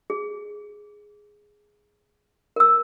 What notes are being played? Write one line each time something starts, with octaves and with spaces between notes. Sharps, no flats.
G#4
A#4 E6